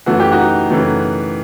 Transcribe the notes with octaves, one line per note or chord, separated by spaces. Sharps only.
F#2 E3 A3 F#4
G4
D#4 F#4
F#2 E3 A3